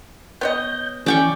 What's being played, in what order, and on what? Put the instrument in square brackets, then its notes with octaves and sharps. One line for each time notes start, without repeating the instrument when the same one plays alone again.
[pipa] B3 C#5 D#5 [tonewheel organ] G6
[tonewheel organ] E3 [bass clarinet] C#4 [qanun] D5 G5 C#6